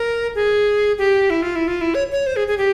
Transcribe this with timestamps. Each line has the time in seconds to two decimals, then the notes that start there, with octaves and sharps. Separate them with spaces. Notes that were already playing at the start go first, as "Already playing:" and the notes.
Already playing: A#4
0.35 G#4
0.98 G4
1.30 E4
1.42 F4
1.55 E4
1.67 F4
1.81 E4
1.95 C#5
2.12 C#5
2.26 C5
2.36 G#4
2.48 G#4
2.58 G4